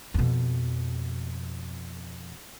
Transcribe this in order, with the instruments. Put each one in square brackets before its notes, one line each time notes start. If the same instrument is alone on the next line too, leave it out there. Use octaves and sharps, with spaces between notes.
[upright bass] F2 B2